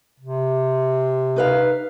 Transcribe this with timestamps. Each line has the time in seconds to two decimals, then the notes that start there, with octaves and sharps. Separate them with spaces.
0.20 C3
1.36 D#4 B4 F5